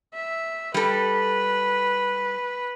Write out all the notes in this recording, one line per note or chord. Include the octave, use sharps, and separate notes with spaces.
E5
G3 A4 B4